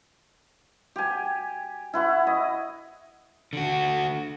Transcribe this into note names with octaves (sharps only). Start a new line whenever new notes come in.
G4 G#5
E4 F#5 C#6
D#5
D3 F#4